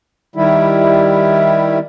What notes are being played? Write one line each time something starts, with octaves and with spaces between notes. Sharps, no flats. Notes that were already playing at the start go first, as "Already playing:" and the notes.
D#3 G3 E4